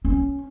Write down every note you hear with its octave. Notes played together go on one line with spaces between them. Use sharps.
C#4